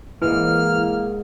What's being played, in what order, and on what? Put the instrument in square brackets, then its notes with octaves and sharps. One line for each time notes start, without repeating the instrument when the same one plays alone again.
[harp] G#2 G#3 [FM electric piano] E3 [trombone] A#3 [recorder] F6